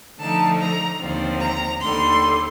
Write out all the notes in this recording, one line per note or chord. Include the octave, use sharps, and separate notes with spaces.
D3 F3 A3 D#4 A5
A#5
D#2 D3 F3 C4
A#5
D#2 D3 G3 C6